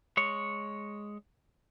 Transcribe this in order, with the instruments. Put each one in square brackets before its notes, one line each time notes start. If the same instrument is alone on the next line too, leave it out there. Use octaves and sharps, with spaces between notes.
[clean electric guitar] G#3 C#5